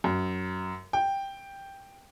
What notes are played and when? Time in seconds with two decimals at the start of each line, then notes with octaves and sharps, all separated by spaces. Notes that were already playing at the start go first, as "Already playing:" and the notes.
0.04 F#2
0.93 G5